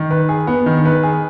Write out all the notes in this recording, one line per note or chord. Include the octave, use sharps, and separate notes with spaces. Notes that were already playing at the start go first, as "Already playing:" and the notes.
Already playing: D#3
B4
G#4
B3
D#3
B4
G#4